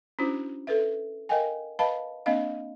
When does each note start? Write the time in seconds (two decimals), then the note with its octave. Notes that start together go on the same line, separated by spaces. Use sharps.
0.19 C#4 D4 E4 F#4 C5
0.67 A4 B4 E5
1.29 A#4 D#5 F5 G5 G#5
1.79 B4 D#5 F5 A5 B5
2.26 A#3 C4 D4 D#5 F5